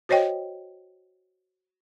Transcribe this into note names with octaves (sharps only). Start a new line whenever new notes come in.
F#4 C5 C#5 D#5 G5